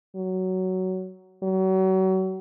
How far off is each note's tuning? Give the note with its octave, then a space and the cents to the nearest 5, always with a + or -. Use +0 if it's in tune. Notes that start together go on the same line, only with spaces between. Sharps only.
F#3 +10
F#3 +35